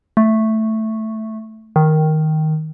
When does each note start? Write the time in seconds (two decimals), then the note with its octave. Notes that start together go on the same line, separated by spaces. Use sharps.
0.17 A3
1.76 D#3